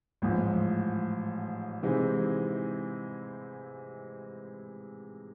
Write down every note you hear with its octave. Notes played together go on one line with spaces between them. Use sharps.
A1 G#2 F3
C3 E3 G#3 C4 D#4